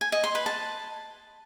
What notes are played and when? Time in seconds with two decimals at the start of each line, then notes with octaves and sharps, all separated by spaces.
0.01 G#5
0.12 D#5
0.24 C6
0.35 B4
0.46 A5